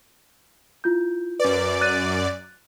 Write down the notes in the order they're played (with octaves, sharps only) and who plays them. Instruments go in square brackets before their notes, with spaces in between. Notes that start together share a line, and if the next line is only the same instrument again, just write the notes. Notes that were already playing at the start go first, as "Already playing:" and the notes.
[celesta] E4 F4 G6
[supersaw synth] F#2 D5 [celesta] B4
[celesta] F#6 A6 D#7